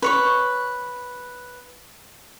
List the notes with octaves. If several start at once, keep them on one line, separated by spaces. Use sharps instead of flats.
B4 C#5 C#6